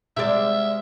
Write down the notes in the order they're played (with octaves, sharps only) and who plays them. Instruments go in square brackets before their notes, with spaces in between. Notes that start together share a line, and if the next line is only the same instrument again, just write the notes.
[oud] C3 G#3 D5 [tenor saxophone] E5